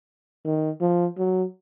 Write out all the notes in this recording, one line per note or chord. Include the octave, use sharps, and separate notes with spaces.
D#3
F3
F#3